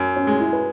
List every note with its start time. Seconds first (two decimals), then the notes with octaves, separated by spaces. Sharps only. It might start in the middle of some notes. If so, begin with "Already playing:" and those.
Already playing: F#2
0.16 C#4
0.27 G#3
0.40 E4
0.53 B4